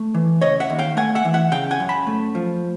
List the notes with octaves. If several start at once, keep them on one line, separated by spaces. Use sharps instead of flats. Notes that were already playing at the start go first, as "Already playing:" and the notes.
Already playing: A3
E3
C#3 C#5 D#5
E5 F#5
D#2
F5 G5
A3 F#5 G#5
E5 F#5
E3
E5 F#5
C#3 F5 G5
F#5 G#5
F#2
A5 B5
A3
F3